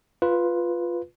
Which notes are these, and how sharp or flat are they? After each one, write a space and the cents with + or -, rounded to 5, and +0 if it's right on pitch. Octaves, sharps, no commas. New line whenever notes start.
F4 +0 B4 +0